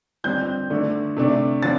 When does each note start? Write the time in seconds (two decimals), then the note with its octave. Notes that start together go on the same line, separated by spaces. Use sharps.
0.24 F2 D3 G3 C4 G6
0.70 D3 A3 D4
1.17 C3 A3 D4
1.63 D3 F3 C4 A6